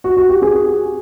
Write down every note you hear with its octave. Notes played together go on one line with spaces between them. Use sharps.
F#4
F#4
G4
G#4